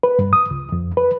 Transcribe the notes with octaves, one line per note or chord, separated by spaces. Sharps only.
B4
G2
D#6
C#2
F2
B4